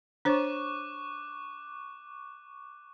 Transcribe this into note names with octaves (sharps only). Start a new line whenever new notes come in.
D4 C5 C#5 C#6 D6 F#6